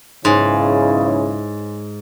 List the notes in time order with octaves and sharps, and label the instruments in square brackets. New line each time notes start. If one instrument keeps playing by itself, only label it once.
[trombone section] B1 C#3 [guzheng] G#2 [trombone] E4 [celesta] C#5 G#5 C6